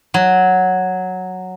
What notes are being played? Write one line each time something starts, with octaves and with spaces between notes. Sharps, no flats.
F#3